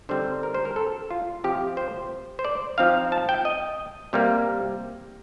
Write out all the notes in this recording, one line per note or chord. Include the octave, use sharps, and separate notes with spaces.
D3 G3 C4 D#4 C5
A#4
C5
A#4
A4
F4
C3 F3 C4 G4
C5
C5
D5
F3 C4 D#4 F5
A5
G5
D#5
C3 G3 A#3